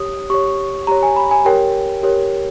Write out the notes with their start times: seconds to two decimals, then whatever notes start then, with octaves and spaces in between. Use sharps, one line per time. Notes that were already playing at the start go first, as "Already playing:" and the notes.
Already playing: G4 C#5 D#6
0.30 G4 C#5 C#6
0.87 G4 C#5 A#5
1.03 G#5
1.16 B5
1.31 G#5
1.45 G4 A#4 C#5 G5
2.03 G4 A#4 C#5